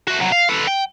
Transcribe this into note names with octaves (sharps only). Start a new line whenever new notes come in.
A3 F#4
C2 F#3
F5
A4 B4
G5